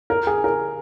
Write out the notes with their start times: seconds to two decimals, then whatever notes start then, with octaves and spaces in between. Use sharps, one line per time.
0.10 A#4
0.27 G#4
0.44 A#4